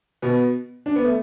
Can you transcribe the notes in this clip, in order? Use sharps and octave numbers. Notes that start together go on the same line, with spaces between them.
B2 B3
D4
B3
A3